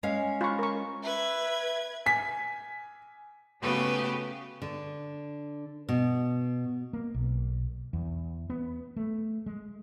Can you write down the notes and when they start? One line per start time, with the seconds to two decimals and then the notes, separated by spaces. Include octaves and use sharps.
0.03 G#3 C#4 F5
0.41 F4 B5 C#6
0.59 A#4 C#6
1.03 B4 E5 G#6
2.06 G#5 B6
3.61 C#3 A3 B3 F#4 G4 B4
4.62 D3
5.89 B2
6.93 A#3
7.14 B1
7.93 E2
8.50 B3
8.96 A3
9.46 G#3